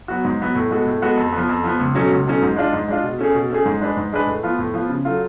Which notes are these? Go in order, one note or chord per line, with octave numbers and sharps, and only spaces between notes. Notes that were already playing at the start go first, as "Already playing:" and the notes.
F#3 B3 F#4
G#2
F#3 B3 F#4
A2
G#3 B3 F#4 A4
A2
G#3 B3 F#4 A4
F2
F3 B3
F2
F3 B3
C#2
B2 F#3 A3 C#4
C#2
B2 F#3 A3 C#4
G#2
G#3 D4 F4
G#2
G#3 D4 F4
B2
A3 C#4 G#4
B2
A3 C#4 G#4
G#2
G#3 D4 G#4 B4
G#2
G#3 D4 G#4 B4
A2
F3 B3 F4
A2
F3 B3 F4
C#3
F#3 A3 F4